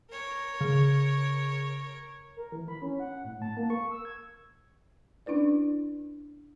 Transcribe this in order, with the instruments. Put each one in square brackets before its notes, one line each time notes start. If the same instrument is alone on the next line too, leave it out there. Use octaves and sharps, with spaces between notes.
[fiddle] A#4 C#5
[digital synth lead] C#3
[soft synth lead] A#4
E3
B5
C#4
F#5
A2
A5
A#3
C#6
E6
G#6
[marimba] C#4 D4 E4 B4 D5